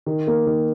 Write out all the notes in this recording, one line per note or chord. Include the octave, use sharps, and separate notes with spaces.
D#3
A#3
D#3